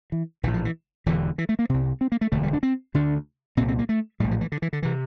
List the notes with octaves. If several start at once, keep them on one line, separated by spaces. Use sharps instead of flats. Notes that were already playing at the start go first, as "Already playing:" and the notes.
E3
A#1 A2 E3
F3
E3
E1 E2 D3 E3
E3
A3
A#3
C2 C3 C4
C4
A#3
A3
E1 D2 D3 A3
G3
D4
C4
D2 D3 D4
C2 A#2 C4
C4
A#3
A3
A#1 A2 G3
F3
E3
D3
E3
D3
C3 E3